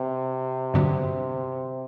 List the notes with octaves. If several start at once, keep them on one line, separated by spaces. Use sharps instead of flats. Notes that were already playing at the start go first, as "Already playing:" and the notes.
Already playing: C3
G2 D3 F#3 B3